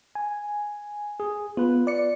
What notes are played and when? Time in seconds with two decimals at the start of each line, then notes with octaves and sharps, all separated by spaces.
0.15 G#5
1.20 G#4
1.57 B3 F4 B4
1.87 D5 C#7